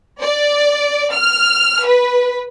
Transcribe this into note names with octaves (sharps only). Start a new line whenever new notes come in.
D5
F6
B4